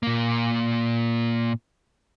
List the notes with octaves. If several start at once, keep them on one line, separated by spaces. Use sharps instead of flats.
A#2 A#3